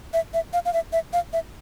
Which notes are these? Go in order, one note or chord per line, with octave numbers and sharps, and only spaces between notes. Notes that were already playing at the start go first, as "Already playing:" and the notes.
E5
E5
F5
F5
E5
E5
F5
E5